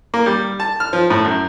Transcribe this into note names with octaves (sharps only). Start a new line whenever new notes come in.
A#3
G3
A5
F6
F3
A2
F#2